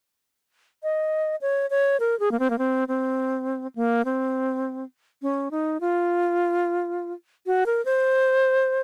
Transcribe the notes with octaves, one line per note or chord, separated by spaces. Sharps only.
D#5
C#5
C#5
A#4
G#4
A#3
C4
A#3
C4
C4
A#3
C4
C#4
D#4
F4
F#4
A#4
C5